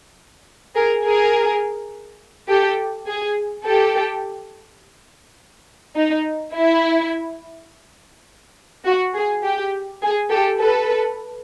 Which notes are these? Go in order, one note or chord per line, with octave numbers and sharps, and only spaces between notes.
G#4 A#4
G#4 A#4
G4 A4
G#4
G4 A4
D#4
E4
F#4
G#4
G4
G#4
G4 A4
A4 B4